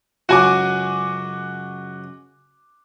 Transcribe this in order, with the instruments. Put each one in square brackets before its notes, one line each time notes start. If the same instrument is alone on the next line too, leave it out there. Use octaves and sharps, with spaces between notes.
[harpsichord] C#2 F#2 C#3 [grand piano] F#4 G#5 D6